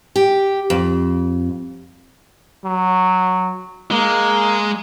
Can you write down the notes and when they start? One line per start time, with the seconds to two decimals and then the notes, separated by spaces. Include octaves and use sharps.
0.16 G4
0.70 F2
2.64 F#3
3.91 G#3 A#3